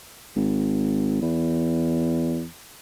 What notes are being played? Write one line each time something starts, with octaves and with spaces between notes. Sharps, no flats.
G#1
E2